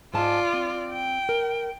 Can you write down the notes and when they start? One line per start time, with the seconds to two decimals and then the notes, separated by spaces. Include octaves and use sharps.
0.14 G#2 G#3 F4 D5 A5
0.53 C4
0.92 G5
1.29 A#4